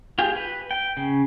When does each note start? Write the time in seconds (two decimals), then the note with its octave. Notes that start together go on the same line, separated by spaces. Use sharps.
0.19 F4 G4 G#4 G5
0.36 B4
0.71 G5
0.97 C#3